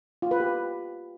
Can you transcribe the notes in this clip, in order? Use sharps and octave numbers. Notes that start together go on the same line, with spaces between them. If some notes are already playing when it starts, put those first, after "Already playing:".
F4
B4
G4